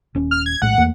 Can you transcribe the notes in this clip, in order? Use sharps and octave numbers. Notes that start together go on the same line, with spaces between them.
D#1 C#4
F6
G#6
A#1 A2 G#3 F#5
E2 A3 A#3